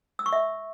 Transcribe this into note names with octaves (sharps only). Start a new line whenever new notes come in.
E6
C#6
E5